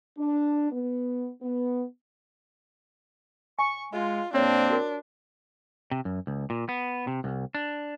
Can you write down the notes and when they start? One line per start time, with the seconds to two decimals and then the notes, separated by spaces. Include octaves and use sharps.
0.18 D4
0.71 B3
1.42 B3
3.59 G#5 C#6
3.93 G#3 F4
4.34 F2 A#2 A#3 C4 D4 C#5
4.70 F#4 A#4
5.91 C3
6.05 F#2
6.27 C#2
6.50 A#2
6.69 B3
7.07 C3
7.24 C2
7.55 D4